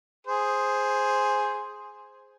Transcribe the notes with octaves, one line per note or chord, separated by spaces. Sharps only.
G#4 C5